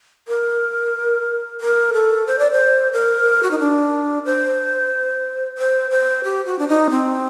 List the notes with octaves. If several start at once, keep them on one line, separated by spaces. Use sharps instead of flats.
A#4
A#4
A4
C5
D5
C5
A#4
F#4
D#4
D4
C5
C5
C5
G4
F#4
D4
D#4
C4